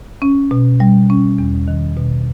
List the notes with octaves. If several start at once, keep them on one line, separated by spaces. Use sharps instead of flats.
C#4
B2
G3
C#4
E2
D#3
B2